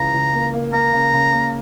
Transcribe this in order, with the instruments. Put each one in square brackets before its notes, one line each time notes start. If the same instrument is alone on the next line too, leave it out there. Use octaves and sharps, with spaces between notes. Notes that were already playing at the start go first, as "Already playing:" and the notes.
Already playing: [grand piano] C#2 C#3 E3 [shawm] A#5
[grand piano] C#2
A#3
A#3
[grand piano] A#3 [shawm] A#5
[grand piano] C#3
C#3
A#3